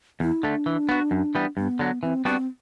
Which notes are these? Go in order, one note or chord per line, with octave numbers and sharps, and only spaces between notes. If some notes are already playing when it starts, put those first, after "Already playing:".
E2 E4
D3 A3 D4
E3
B3 F#4
F#2
E3 G3 B3
G2 B3
D3 F#3
E3 C4
G3 B3 C4 D4 F#4